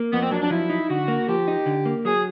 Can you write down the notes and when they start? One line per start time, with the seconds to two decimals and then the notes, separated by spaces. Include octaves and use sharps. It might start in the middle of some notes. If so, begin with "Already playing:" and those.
Already playing: A#3
0.12 F2 B3
0.22 C4
0.31 F#3 D4
0.41 D4
0.50 F3 E4
0.70 D#4
0.89 D3 F#4
1.08 A#3
1.28 F3 G4
1.48 D#4
1.66 D3
1.86 A#3
2.05 F#3 G#4